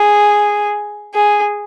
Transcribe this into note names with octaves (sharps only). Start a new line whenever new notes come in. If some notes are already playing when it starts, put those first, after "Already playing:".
Already playing: G#4
G#4